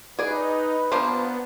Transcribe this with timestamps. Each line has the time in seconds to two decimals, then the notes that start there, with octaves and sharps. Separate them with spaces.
0.19 D#4 G#4 B4 D5
0.92 F3 G3 A#3 B3 D4 C5